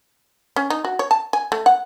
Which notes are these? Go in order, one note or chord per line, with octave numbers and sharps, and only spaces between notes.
C#4
D#4
F#4
C#5
A5
G#5
A3
F#5